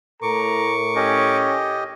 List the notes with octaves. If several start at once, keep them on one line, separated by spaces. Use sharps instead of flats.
A2 A4 A#4 A#5 C#6 D6
C#4 G4 D#5